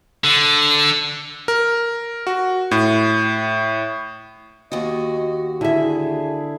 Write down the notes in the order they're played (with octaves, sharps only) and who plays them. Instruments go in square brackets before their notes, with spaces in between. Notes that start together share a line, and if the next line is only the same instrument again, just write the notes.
[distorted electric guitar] D3
[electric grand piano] A#4
F#4
A2
[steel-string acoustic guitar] D#2 F#4 [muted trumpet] D#5
[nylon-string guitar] D3 E5 [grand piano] E4 [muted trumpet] G#4